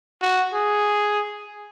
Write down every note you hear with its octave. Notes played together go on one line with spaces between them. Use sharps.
F#4
G#4